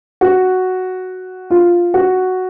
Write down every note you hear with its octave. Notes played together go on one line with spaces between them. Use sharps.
F#4
F4
F#4